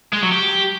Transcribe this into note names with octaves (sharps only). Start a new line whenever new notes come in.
G#3
F#3
G4